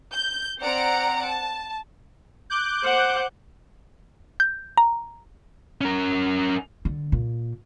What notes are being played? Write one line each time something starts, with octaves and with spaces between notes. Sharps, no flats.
G6
C4 D5 F#5 A#5 D7
A5
D6 F#6 G6
C5 F#5
G6
A#5
C#4 A#4
D3
A#2